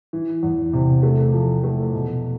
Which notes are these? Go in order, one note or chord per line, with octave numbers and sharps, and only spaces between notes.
E3
E2
C3
A3
F3
A3
B2